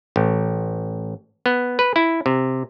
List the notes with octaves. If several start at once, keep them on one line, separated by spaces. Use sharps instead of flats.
A1
B3
B4
E4
C3